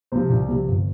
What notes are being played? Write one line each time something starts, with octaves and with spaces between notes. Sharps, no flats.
C3 F3 C5
C2
C3 F3
G1